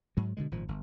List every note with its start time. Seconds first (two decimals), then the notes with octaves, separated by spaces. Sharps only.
0.17 G#2 F#3
0.37 B2 D3 D#3 G#3
0.51 G#1 A#2 F3
0.68 G1